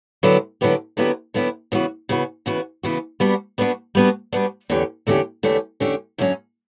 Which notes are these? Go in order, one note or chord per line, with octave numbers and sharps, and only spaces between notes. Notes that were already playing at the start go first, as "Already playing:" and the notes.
D3 F#3 B3 E4 G4
D3 F#3 B3 E4 G4
D3 F#3 B3 E4 G4
D3 F#3 B3 E4 G4
C#3 E3 B3 F#4
C#3 E3 B3 F#4
C#3 E3 B3 F#4
C#3 E3 B3 F#4
G3 B3 D4 F#4
G3 B3 D4 F#4
G3 B3 D4 F#4
G3 B3 D4 F#4
E2 D3 A3 C#4 G4
E2 D3 A3 C#4 G4
E2 D3 A3 C#4 G4
E2 D3 A3 C#4 G4
F#2 D3 F#3 C#4